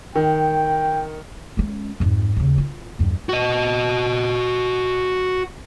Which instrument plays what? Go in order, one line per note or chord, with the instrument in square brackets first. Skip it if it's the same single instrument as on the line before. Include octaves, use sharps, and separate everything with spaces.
[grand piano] D#3 [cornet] G5
[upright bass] G#3 C#4
F2 G#2
D#2 C#3
F4
E2 G2
[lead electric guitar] F#4 D#5